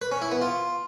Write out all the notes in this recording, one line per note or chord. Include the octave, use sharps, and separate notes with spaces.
B4
C#4
E4
B3
F4